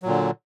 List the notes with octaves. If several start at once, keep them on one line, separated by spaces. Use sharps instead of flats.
A#2 D3 F#3